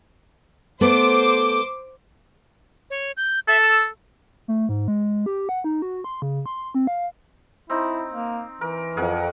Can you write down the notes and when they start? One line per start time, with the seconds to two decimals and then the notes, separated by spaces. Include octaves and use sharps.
0.81 A3 B3 C5 D6
2.90 C#5
3.17 G6
3.48 A4 E5
3.62 E6
4.48 A3
4.69 G#2
4.88 G#3
5.26 G4
5.49 F#5
5.64 D#4
5.82 F#4
6.04 C6
6.22 C#3
6.46 C6
6.75 C4
6.87 F5
7.70 C4 D#4 E4
8.13 A#3
8.61 E3 A#4
8.97 F2 G#4 A#4 F#5